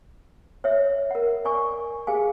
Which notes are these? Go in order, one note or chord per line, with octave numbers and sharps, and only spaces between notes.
C#5 E5
A#4 F#5
D5 G#5 C#6
G#4 F5 G#5